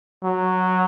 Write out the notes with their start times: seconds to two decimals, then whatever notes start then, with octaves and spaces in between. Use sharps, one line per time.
0.23 F#3